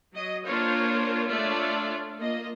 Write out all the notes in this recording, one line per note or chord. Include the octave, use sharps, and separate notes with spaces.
F#3 D#5
A#3 D4 F4 A#4 C5 C#5
A3 D4 F4 C#5 D5 E5
A#3 F4 D#5